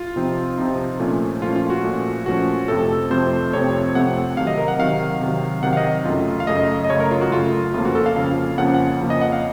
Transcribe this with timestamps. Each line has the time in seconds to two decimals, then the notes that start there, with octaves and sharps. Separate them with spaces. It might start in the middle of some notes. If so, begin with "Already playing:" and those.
Already playing: F4
0.16 C3 F3 C4 D#4
0.58 C3 F3 C4 D#4
1.00 A#2 F3 A3 C#4
1.42 A#2 F3 A3 C#4 F4
1.56 F4
1.70 F#4
1.84 A#2 F3 A3 C#4
2.26 A#2 F3 A3 C#4 F#4
2.68 F2 C3 F3 A3 C4 A4
3.10 F2 C3 F3 A3 C4 C5
3.53 F2 C3 F3 A3 C4 C#5
3.95 F2 C3 F3 A3 C4 F#5
4.37 C3 D#3 F#3 F5
4.47 D#5
4.58 A#4
4.68 F#5
4.79 C3 D#3 F#3 F5
5.21 C3 D#3 F#3
5.63 C3 D#3 F#3 F#5
5.73 F5
5.77 D#5
6.05 F#2 C#3 A3 F4
6.40 F5
6.47 F#2 C#3 A3 D#5
6.84 D#5
6.90 F#2 C#3 A3 C#5
7.00 A#4
7.11 F4
7.21 F#4
7.32 F#2 C#3 A3 F4
7.74 F2 C#3 F3 A#3 C#4 F4
7.85 F#4
7.95 A4
8.06 F5
8.16 F2 C#3 F3 A#3 C#4 F5
8.58 F2 C#3 F3 A#3 C#4 F#5
8.74 F#5
9.00 F2 C#3 F3 A#3 C#4
9.10 D#5
9.21 F#5
9.32 F5